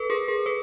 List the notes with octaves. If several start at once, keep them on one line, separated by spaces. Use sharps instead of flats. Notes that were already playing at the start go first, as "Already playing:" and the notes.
Already playing: A4 B4
G#4 A#4
G#4 A#4
A4 B4